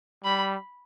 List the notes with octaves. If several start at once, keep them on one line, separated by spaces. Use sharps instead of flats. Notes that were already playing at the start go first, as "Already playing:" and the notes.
G3 B5